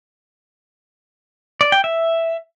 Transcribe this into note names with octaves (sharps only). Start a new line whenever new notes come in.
D5
G5
E5